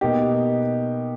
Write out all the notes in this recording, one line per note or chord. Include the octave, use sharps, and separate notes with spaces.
B2 A#3 D#4 G4